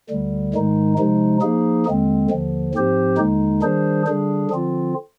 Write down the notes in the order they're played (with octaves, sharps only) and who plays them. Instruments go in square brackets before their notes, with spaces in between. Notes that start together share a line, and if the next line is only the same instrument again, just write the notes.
[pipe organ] D2 D3 G3
G#2 D#3 G#3 D#4
C3 F3 G#3 D#4
F3 A#3 D#4 G#4
D#2 D3 G#3 C4
D#2 D3 F3
G#2 F3 C4 G4 C5
D#2 D3 G#3 D#4
D#3 G3 D4 G#4 C5
D3 G3 D4 G#4
D3 F3 C4 F4